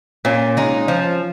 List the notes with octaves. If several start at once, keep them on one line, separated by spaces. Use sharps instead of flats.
A#2 C#4 F4
G#3 D#4
F3